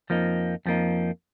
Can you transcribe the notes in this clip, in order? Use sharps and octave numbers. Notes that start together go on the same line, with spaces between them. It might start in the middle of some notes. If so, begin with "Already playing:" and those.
F2 F3 A#3 D#4
F2 F3 A#3 D#4